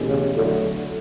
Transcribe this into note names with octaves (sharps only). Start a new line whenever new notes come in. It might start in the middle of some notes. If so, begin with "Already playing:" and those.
Already playing: E2 B2 A3 C#4 G4
C#3
D3 F#3 A3 E4 A4 C#5